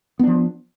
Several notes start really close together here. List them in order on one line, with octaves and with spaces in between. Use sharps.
B3 D4 F3